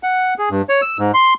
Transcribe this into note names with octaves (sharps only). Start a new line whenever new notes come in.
F#5
G#4
G2
C#5
E6
G#2
C6